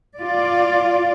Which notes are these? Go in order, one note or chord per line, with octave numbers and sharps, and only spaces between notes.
F4 D5